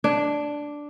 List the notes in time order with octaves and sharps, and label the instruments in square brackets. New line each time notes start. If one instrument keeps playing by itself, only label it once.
[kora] D4